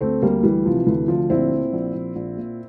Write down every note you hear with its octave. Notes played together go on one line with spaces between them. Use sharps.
D2 A3 C4
D2 G3 A#3
E3 G3
C3 F3
D2 E3
D2 F3
A#1 C4 E4
A#2
A#1
A#1
A#1
A#2